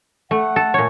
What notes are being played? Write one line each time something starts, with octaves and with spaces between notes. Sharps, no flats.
A3 F#5
A4
A#2 C#5